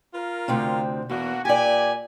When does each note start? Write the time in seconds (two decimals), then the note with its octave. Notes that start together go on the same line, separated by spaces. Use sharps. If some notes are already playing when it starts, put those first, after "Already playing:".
0.14 F4 A#4
0.48 D2 C3 C4
1.10 E2 B2 A#3 F#4
1.45 A#2 G4 D5 G#5